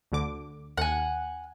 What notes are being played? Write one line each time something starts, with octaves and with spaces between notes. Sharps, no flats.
D2 D3 D6
D#2 F#5 G#5